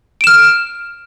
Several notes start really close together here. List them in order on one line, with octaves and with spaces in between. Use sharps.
D7 E7 F6